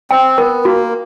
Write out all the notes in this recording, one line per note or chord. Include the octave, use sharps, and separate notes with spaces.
C4 G5
B3 A#4
A#3 F#4